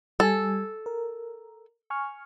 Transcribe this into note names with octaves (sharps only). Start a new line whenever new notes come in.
G3 A4 G#5
A#4
G#5 C#6 F6